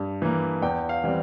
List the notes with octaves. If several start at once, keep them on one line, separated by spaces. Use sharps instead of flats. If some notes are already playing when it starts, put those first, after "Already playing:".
Already playing: G2
E3 A#3
E2 G5
F5
E3 G3 C4